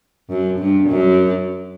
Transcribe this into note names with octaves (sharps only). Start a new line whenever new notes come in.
F#2
G2
F#2